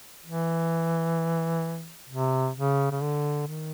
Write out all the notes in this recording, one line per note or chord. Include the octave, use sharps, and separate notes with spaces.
E3
C3
C#3
C#3
D3
D#3